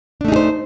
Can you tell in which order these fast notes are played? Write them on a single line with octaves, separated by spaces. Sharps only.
D4 A3 D#4 G#4 C5